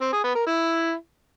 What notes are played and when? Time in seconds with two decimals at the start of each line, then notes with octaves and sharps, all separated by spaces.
0.01 C4
0.12 G#4
0.24 B3
0.35 A#4
0.46 E4